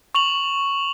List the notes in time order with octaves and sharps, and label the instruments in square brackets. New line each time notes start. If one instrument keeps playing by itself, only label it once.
[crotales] C#6 F7 F#7